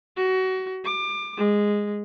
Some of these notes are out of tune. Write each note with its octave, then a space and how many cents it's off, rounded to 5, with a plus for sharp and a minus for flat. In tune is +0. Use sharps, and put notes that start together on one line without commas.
F#4 +25
D6 +25
G#3 -10